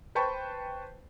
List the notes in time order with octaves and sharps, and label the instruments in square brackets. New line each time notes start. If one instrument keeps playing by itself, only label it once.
[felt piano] B4 C5 G5 A5 B5 C#6